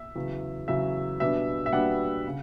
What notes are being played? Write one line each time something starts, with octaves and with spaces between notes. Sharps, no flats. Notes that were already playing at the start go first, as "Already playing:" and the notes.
Already playing: E5
E2 C#3 F#3
E2 C#3 F#3 E5
B2 G3 B3 D4 E5
E5
B2 G3 B3 D4 F#5
C#3